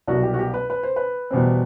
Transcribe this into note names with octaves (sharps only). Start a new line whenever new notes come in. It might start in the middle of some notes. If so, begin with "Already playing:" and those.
C2 B2 F#3 F#4
G4
F#4
G4
B4
B4
C5
B4
E2 B2 G3 C4